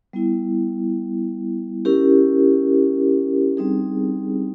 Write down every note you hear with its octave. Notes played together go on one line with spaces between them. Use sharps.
G3 B3 E4
C#4 E4 G4 A#4
G3 C4 D#4 G#4